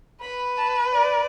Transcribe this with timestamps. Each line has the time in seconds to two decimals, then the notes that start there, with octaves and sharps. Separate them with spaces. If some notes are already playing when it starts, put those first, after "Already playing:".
0.22 B4 B5
0.57 A5
0.93 D5